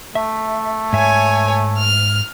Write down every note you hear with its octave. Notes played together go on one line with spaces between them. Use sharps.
A3 E5
G#2 C#5 E5 G#5
F6